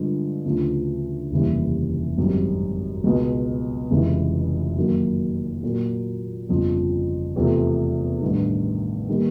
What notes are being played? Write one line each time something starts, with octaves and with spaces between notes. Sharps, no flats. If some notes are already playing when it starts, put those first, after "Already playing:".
Already playing: G2 D3 F3 G#3
D2 C#3 F3
F1 D#2 C#3 E3 G3
G#1 F#2 D#3 G3 C4
C#2 B2 G#3
F1 F2 C#3 E3 G#3
F#2 D#3 F#3 A#3
A#2 F#3 A#3
G1 F2 C#3 F3
E2 C3 F3 A3
A1 G2 D#3
D#3 G3 A#3